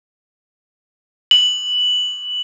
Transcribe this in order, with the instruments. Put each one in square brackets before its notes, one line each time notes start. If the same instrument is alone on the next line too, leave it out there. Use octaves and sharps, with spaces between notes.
[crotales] F#7